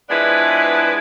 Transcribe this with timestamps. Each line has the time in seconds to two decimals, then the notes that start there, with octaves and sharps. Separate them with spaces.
0.10 F3 G#3 B3 D4 E4 B4